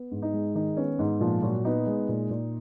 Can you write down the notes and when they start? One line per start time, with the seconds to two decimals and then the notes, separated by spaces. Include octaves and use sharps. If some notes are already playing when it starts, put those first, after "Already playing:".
Already playing: B3
0.11 G#2
0.22 D#4
0.33 G#3
0.55 D#3 D#4
0.77 B3 C#4
0.99 G#2 D#4
1.20 A#2 F3 F4
1.42 A#2 F#3 F#4
1.65 B3 D#4
1.86 G#3
2.09 A#2
2.30 A#2